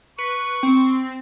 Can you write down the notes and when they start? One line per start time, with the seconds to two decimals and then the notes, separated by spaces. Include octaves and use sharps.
0.18 B4 C#6
0.63 C4